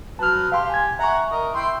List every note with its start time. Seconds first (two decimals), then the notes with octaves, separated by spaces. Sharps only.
0.19 F#3 B4 A5 F6
0.52 G4 F5 C6
0.70 G#5 G#6
0.99 E5 F#5 G#5 A#5 C#6
1.31 A#4 D#5
1.55 E4 G5 C6